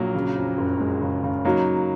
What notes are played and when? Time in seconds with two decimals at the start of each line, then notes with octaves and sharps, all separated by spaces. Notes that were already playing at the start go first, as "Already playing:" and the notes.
Already playing: A#1 F#3 A#3
0.15 C#3
0.36 F2
0.58 F#1
0.80 G#3
1.02 C#3
1.24 C#3
1.45 F#3 A#3 D#4